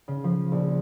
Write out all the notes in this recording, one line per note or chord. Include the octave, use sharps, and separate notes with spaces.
C#3
F3
A#1